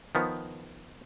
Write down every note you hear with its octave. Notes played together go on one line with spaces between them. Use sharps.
D#3 F3 B3